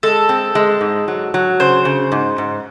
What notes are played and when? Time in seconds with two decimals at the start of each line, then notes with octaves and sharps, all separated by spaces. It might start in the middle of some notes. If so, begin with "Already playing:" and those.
0.03 G#3 A4
0.29 C4
0.55 G#3
0.81 G#2
1.08 F#3
1.34 F#3
1.60 C#3 C5
1.85 C#3
2.12 G#2
2.38 G#2